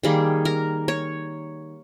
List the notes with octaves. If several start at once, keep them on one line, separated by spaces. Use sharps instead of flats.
D#3 G3 A#3 G#4
A#4
C#5